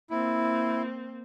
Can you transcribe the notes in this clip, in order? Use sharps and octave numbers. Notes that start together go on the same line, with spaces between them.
A#3 C4 E4